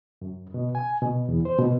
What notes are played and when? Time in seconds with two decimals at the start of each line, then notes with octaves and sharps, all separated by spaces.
0.22 F#2
0.54 B2
0.75 G#5
1.02 B2
1.29 E2
1.45 C5
1.58 B2